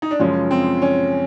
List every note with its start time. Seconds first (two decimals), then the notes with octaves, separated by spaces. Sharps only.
0.02 D#4
0.11 D4
0.19 F#2 C#3 F3 G#3 C#4
0.51 C4
0.82 C#4